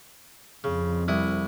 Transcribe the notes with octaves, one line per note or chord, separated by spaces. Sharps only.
F2 C#3
C2 E4 D#6